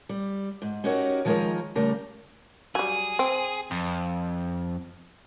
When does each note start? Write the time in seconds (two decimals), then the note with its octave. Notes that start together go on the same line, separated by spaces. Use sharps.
0.09 G3
0.62 G#2
0.84 C#4 D#4 F#4 G4 A#4 C#5
1.25 D#3 F3 G#3 G#4 A#4 C#5
1.75 C#3 G3 A3 G4 A#4
2.75 F#3 G3 G#4
3.19 C4
3.71 F2